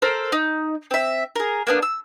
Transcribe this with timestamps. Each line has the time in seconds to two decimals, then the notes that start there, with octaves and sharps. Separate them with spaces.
0.02 A4 A#4 C5
0.32 D#4
0.91 C4 E5
1.36 G#4 A#4
1.67 A#3 B3 D4
1.82 E6